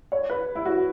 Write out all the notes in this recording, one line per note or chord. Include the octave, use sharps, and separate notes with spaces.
C#5
B4
E4
F#4